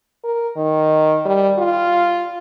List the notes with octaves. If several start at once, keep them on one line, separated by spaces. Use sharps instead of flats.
A#4
D#3
G3
F4